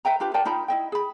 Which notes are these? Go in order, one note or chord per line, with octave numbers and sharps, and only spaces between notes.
B4 E5 G5 A#5
D4 F4 G4 B4
A#4 D5 G5 A5
D#4 F4 G5 B5
E4 D#5 G5
G#4 B5